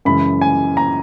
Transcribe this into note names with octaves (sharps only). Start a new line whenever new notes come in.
F#2 C#3 E3 G#3 B5
G#5
A#5